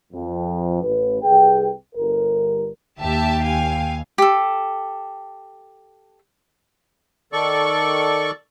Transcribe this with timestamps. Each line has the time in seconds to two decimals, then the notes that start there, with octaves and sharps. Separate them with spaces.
0.13 F2
0.82 A1 B4
1.23 C2 G#4 B4 G5
1.95 G1 A#4
3.00 D#2 G4 E5 G5 A5
3.45 F5 G#5
4.18 G4 A4
7.33 D#3 A4 D5 C#6